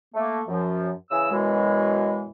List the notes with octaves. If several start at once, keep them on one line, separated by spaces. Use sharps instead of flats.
A3 A#3
F#2 F3
C#3 E3 G#4 E6
F#2 B2 E3 G#3